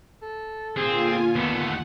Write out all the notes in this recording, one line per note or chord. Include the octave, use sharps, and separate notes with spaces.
A4
A#2 D3 C4 F4 G#4 G#5
D#2 A3 B3 F#5